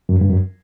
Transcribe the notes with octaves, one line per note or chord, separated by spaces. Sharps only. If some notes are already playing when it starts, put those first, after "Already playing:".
F#2
G2
F#2